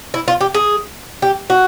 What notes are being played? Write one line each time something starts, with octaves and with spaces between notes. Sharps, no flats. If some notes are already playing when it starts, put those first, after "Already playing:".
E4
F4
G4
G#4
G4
F#4